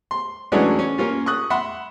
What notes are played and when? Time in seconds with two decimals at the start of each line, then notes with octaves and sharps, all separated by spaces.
0.11 C6
0.52 E3 F#3 G#3 A3 C#4 D4
0.79 C#4
0.98 A#3 C#4 F4
1.26 C#6 D#6 F#6
1.50 E5 F#5 B5 C6